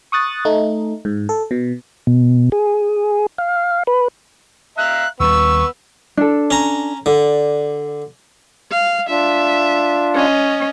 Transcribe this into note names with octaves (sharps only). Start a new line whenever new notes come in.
C#6 D#6 F#6 A6
A3 D#4
G#2
A4
B2
B2
G#4
F5
B4
E5 F5 A#5 F#6
D#2 G3 B3 C#6 E6
D4 A4
C#4 A#5
D3 D5
F5
D4 F4 E5
C#4 D#5